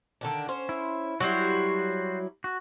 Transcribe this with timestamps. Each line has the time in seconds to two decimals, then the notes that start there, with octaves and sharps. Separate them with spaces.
0.21 D3 D#3 D4
0.49 C#4 C5
0.69 E4
1.20 F#3 G3 E4 F#4 C5
2.44 F#4